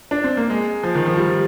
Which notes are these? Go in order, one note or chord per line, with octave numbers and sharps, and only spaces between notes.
D4
C4
A#3
G#3
F3
D#3
F3
G3